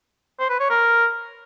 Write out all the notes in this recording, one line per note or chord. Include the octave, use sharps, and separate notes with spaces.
C5
B4
C#5
A#4